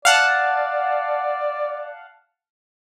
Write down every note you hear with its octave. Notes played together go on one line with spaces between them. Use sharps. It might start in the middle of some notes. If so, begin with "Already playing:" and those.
D5 F5 F#5 A5